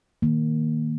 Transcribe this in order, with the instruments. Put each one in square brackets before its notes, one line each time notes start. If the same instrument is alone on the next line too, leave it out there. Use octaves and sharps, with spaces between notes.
[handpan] D#3 A#3